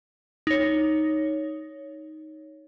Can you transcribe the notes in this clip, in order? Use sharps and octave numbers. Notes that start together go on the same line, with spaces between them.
D#4 C#5